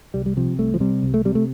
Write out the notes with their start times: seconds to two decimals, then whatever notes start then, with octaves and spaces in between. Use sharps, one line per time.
0.14 C2 G3
0.26 G3
0.37 C3 F3
0.59 C2 A3
0.74 F3
0.80 C3 G3
1.03 C2
1.14 A3
1.25 C3 G3
1.35 A3